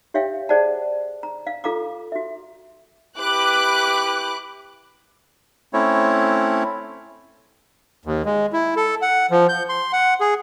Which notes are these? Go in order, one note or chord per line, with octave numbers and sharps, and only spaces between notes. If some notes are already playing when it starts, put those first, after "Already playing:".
G4 C#5 E5 F5 G5
G#4 C5 D5 F#5 A5
A#5
F5
F4 A4 F5 A#5 D6
F#4 E5
E4 G4 B4 D6 F#6
A3 C4 C#4 E4 C#5
D#2
G#3
E4
A4
F#5
F3
G6
C6
F#5
G#4